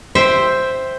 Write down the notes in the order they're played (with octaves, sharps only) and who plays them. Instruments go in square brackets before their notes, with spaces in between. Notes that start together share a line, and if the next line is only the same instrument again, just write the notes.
[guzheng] C5 E5 G5